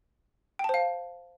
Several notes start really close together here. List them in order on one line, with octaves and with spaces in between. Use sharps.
G5 A5 C5 F5